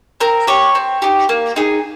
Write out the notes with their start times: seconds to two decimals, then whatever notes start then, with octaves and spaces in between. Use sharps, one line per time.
0.20 C4 A#4
0.47 G4 C#5
0.75 C4
1.02 D#4 G4
1.29 A#3
1.56 D#4 G#4